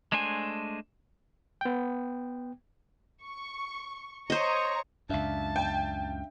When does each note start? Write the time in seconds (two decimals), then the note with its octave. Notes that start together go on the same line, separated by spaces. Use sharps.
0.12 G#3 A3 D4 C5 G#5
1.61 B3 G5
3.24 C#6
4.30 C5 C#5 D#5 A#5 C#6
5.10 C#2 F#2 D4 E5 F5 A5
5.56 G5